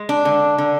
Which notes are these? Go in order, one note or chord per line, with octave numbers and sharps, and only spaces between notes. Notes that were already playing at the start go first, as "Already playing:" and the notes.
Already playing: G#3
D4
D3
D3